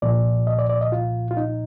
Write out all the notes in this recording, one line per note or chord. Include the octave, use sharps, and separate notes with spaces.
C2 A#2 F3 D5
D#5
D5
D5
D#5
F4
F4
D#4